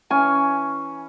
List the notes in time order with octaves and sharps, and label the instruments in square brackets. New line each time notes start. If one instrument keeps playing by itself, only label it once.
[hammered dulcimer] E3 C#4 [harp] G#5